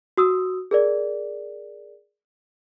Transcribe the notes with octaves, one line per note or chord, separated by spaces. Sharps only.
F#4 D#6 E6
G#4 A#4 D5